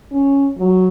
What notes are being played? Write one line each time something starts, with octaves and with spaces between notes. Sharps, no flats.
C#4
F#3